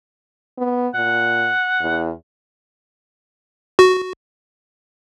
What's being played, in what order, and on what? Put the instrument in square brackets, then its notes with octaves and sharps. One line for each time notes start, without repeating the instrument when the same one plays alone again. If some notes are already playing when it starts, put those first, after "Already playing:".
[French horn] B3
[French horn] A#2 [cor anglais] F#5
[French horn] E2
[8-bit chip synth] F#4